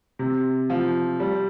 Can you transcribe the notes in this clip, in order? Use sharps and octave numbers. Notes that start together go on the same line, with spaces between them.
C3
F3
G3